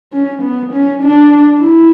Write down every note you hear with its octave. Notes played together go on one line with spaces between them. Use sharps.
C#4
B3
C#4
D4
E4